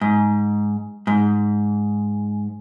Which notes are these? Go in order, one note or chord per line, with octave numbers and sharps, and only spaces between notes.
G#2
G#2